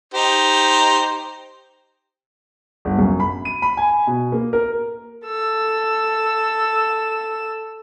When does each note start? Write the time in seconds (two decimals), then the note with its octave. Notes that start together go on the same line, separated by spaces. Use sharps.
0.14 D#4 G4 C5
2.85 G1
2.99 F#2
3.20 B5
3.45 D#7
3.62 B5
3.77 G#5
4.07 B2
4.32 A#3
4.53 A#4
5.24 A4 E6